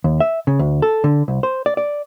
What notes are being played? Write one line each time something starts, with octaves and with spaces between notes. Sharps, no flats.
D#2
E5
C#3
D2
A4
D3
C2
C5
D5
D5